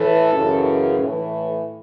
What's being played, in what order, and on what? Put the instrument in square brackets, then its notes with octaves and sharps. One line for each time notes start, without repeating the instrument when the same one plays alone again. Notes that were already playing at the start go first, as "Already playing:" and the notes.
Already playing: [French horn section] A2 E3 A4
F#2 C#3 E3
A2 E3